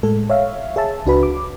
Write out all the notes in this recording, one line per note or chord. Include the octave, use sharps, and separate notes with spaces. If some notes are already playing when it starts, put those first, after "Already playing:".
A2 G#3 A4
C#5 E5 F5
G#4 C#5 E5 A5
C#2 D4 F#4 B4 B5
D6